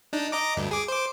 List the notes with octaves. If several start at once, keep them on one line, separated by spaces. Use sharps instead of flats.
D4 D#4
D#5 A#5 D6
D2 G2
G#4 D6
C5 D6